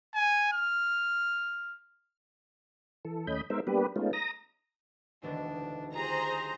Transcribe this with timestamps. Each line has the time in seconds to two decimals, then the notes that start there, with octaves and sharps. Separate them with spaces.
0.15 G#5
0.53 F6
3.05 E3 A4
3.27 D#2 A3 C#4 D#5 B5 G6
3.50 G#3 B3 D#4 A#4 C5 E5
3.67 G3 A#3 B3 D4 G4 B4
3.96 G#3 A3 B3 C#4 D#4 F4
4.13 A#5 D#6 A#6
5.23 E1 D2 D#3 D4
5.94 F4 G4 G#4 C5 A#5